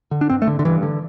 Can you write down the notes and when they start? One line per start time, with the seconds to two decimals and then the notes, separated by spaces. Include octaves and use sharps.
0.11 D3
0.21 D4
0.30 G2 C4
0.42 A3
0.47 D3
0.59 D3
0.65 G2 E3
0.83 D3